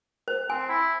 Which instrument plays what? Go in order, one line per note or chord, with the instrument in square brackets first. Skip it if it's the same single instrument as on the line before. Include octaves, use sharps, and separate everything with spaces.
[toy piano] C5
[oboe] C4 [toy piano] G#5
[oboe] E4